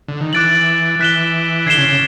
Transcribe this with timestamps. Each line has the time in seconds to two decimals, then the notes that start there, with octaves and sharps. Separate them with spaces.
0.08 D3
0.21 D#3
0.33 E3 D6 F#6 A6 D7 F#7
0.99 E3 F#6 B6 E7 G7
1.66 D3 G#6 C7 E7 G7
1.78 C#3
1.89 C#3